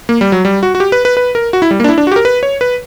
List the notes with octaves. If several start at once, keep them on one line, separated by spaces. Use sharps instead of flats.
A#3
G3
F#3
G3
F#4
F#4
G4
B4
B4
B4
A#4
F#4
E4
G3
A#3
D4
E4
D4
F#4
G4
A#4
B4
C#5
B4